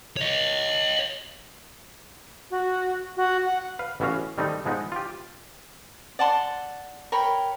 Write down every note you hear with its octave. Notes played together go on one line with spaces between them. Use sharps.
C#5 D#5
F#4
F#4
F#5
B4 F5
A1 E3 B3 C#4 F#4 F5
D#3 G3 A3 C4 D#4
F3 G#3 B3 D#4
F4 G4
D5 F#5 A5 C6
A#4 C#5 G5 B5